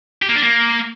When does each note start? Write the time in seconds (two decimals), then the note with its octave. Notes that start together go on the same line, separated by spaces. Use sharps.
0.22 G4
0.29 A#3
0.36 D4
0.43 A#3